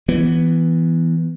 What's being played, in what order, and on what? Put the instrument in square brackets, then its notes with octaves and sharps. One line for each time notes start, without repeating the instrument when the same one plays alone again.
[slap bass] E3 B3